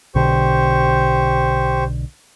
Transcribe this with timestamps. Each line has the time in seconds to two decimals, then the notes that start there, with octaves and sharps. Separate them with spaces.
0.15 B1 B2 D3 G4 C5 C#6